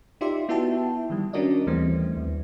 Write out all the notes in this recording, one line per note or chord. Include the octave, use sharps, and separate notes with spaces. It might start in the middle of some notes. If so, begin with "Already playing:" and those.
D#4 F4 G4 D5 E5 C6
B3 E4 F#4 E5 G5 A5
D#3 G3
C#4 D4 F#4 A#4 D5 D#5
D#2 E3 G3 A3 C4
D#2